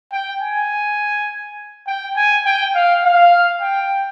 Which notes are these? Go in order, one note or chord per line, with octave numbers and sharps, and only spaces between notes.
G5
G#5
G5
G#5
G5
F5
F5
G5